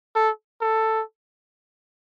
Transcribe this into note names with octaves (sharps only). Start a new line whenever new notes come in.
A4
A4